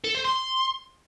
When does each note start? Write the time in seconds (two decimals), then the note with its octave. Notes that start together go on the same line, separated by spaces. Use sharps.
0.04 A4
0.14 C5
0.25 C6